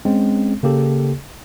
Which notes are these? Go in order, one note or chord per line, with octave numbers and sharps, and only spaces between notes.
G#3 C4 C#4
C#3 A#3 G4 A4